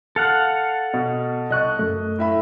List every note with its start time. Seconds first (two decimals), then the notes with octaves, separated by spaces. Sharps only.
0.16 A4 F5 F#5
0.94 B2
1.50 C2 D#5 C#6 F#6
1.79 F#2 A3
2.19 A2 E5 B5